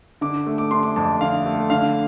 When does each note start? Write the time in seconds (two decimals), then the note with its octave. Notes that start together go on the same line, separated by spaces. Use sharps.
0.21 D3 D6
0.46 A3
0.58 D6
0.71 D4 C6
0.83 D6
0.96 F2 A5
1.21 D3 F5
1.46 A3
1.70 D3 F5